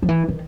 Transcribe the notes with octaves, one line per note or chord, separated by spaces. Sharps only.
F3
E3
D#3